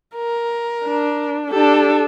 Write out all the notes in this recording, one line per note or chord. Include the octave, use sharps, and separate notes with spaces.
A#4
D4
D4 G4 A4